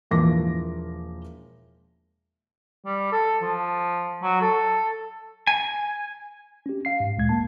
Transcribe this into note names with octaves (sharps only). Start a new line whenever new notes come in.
E1 E3 F3 A#3 D6 A#6
G3
A4
F3
F#3
A4
G#5
C#4 G4
F5 C7
G#2
D2 A#2 G#3 G#6
G1 A#3 A5